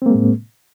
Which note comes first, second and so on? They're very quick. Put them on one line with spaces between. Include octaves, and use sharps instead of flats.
C4 A#3 G#3 A2